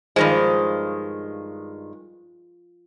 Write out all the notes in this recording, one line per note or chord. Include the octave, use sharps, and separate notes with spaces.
G2 D#3 F3 G#3